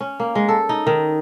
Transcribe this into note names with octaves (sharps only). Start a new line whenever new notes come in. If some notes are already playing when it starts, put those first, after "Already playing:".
C#4
A#3
G#3
A4
D#4
D#3